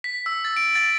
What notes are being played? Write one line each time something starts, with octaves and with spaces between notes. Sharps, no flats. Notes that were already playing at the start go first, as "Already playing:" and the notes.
B6
E6
A6
D7
A6